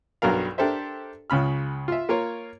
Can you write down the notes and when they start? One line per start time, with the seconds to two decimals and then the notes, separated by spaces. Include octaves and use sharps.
0.22 B1 G2 F#3 A#4 F5
0.58 D4 G4 A4 A#4 C5 E5
1.30 C#2 C#3 B5 F6
1.88 F4 E5
2.09 A#3 F4 A#4 C#5